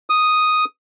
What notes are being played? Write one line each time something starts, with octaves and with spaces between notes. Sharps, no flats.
D#6